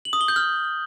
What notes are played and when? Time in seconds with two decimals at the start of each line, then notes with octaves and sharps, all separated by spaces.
0.05 F#7
0.13 D#6
0.21 G7
0.28 G6
0.36 F6